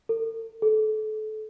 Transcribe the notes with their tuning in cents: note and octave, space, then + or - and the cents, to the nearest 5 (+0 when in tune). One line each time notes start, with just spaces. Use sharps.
A4 +45
A4 -30